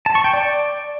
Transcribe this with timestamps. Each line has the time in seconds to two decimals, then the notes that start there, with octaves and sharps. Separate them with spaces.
0.06 A5
0.15 C#6
0.24 G5
0.33 D5